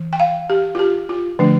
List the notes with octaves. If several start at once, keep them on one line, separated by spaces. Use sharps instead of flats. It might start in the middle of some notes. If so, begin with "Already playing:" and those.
Already playing: E3
G5
F5
G4
F4
G4
F4
D3 F3 A3 D4